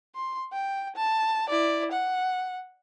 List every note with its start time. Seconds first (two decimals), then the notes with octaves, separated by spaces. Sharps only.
0.15 C6
0.52 G5
0.96 A5
1.49 E4 D5
1.92 F#5